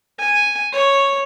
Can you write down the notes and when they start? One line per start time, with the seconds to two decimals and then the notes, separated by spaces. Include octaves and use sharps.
0.19 G#5
0.72 C#5